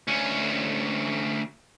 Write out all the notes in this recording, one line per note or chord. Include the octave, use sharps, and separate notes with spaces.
D2 C#4